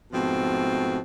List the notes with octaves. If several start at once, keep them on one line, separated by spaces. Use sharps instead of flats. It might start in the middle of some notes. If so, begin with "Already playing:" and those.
G#2 B2 F3 A3 C4